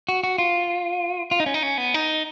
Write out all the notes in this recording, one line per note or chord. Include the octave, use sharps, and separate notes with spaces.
F#4
F#4
F4
F4
D#4
C#4
D#4
C#4
B3
D#4